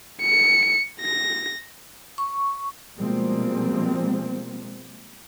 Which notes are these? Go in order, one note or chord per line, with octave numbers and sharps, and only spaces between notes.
C#7
A#6
C#6
B2 F3 G3 G#3 A#3 C4